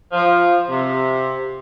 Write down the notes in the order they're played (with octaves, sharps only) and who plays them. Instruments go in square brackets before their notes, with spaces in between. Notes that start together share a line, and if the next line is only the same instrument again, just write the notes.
[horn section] F3
C3